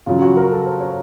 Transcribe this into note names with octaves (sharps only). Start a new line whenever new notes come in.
C#3 F#3 F4
F#4
A#4
A4
C5
C#5